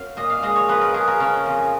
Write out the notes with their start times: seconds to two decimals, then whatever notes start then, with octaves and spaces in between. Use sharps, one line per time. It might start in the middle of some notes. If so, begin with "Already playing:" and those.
Already playing: F#2 F5
0.17 A#2 D#5
0.30 F5
0.42 G#3 D#5
0.56 C#5
0.68 F3 B4
0.81 A#4
0.94 F3 G#4
1.08 A#4
1.20 C#3 C#4
1.46 F2